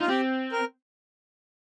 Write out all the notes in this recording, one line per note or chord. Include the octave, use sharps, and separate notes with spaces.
D#4 F4
C4 G4
A#4